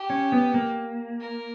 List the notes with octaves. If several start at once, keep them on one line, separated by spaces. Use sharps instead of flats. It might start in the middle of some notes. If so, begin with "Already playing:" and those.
Already playing: G4
C#4
B3
A#3
A#4